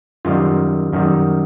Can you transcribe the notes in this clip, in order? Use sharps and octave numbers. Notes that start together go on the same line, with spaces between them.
F#2 D#3 G3 F4
F#2 D#3 G3